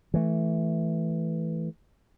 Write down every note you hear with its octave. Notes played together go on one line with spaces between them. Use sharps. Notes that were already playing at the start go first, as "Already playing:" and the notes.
E3 A3